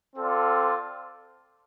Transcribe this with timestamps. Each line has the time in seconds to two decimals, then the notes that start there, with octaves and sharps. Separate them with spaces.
0.16 C4 F4 A4 D5